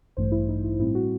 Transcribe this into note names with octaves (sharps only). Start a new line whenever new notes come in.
A1 G2 E3 A3 C5
E4
D#4
E4
A2 G3 C4 E4
F#4